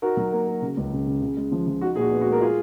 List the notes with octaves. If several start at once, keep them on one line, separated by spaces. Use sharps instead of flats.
D#4 F#4 A#4
F#3
A#3
A#3
C#3
C#2
C#3
C#3
C#3
G#3
F3
F3
D#4 F#4
A#2 G#4
F#4
B3
F#4
G#3
A#4
F4 G#4